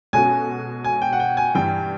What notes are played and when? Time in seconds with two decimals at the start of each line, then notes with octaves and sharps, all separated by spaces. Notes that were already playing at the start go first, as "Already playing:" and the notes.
0.13 B2 G#3 C#4 F#4 A4 G#5
0.85 G#5
1.02 G5
1.13 F#5
1.20 G5
1.37 G#5
1.55 G2 E3 G3 G5